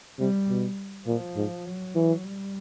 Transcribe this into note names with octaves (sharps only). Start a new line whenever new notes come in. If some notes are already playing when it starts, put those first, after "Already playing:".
C3 G3
B2
A#2 F3
G#2
F#3
E3
G3